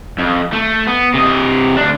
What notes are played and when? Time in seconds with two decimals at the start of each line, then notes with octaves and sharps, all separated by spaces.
0.19 F2
0.53 A3
0.88 B3
1.15 C3 D#5
1.77 D2 D4